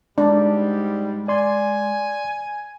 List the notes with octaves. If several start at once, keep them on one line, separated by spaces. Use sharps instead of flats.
G#2 G3 G#3 D4 D5
D5 G#5 C6